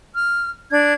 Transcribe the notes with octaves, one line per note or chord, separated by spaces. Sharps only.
F6
D4 G#6